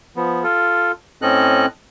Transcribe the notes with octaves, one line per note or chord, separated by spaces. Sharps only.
F3 B3
F4 A4
A2 C4 C#4 A4 D#5 F#6